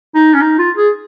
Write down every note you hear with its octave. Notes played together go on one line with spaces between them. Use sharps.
D#4
C#4
D#4
F4
G#4